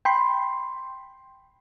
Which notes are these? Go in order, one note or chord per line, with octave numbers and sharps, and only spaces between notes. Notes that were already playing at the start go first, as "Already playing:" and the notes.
G5 B5 C6